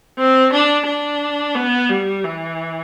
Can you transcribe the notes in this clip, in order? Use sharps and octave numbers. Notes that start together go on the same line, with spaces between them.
C4
D4
D4
B3
G3
E3